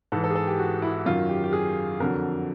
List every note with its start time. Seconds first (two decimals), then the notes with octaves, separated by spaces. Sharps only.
0.12 G#2 E3 A4
0.24 A4
0.31 G#4
0.35 A4
0.47 G4
0.59 F#4
0.82 E4
1.06 F#2 D#3 F#3 F4
1.29 G4
1.44 G4
1.53 G#4
2.00 F2 D3 F#3 A#4